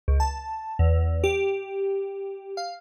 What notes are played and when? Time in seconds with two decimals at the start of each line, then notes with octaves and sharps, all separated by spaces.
0.08 C#2
0.20 A5
0.79 E2
1.24 G4
2.57 F5